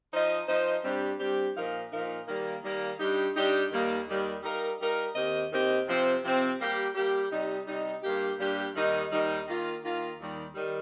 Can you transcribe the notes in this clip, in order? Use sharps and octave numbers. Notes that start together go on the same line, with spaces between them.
F3 D#4 C5 D#5
F3 D#4 C5 D#5
G2 G3 C4 G4
G2 G3 C4 G4
A#2 F3 D#4 A#4 F5
A#2 F3 D#4 A#4 F5
D#3 G3 A#3
D#3 G3 A#3
G2 G3 D#4 G4
G2 G3 D#4 G4
D#2 D#3 G3 A#3
D#2 D#3 G3 A#3
G3 D#4 A#4 F5
G3 D#4 A#4 F5
D#2 D#3 C4 G4 D#5
D#2 D#3 C4 G4 D#5
C3 F3 C4
C3 F3 C4
G3 A#3 G4
G3 A#3 G4
C3 G3 D#4
C3 G3 D#4
G2 G3 A#3 G4
G2 G3 A#3 G4
D#2 D#3 G3 D#4
D#2 D#3 G3 D#4
D#3 A#3 F4
D#3 A#3 F4
D#2 D#3 G3
D#3 G3